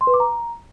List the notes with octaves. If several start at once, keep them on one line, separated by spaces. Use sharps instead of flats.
C6
B4
D6
A#5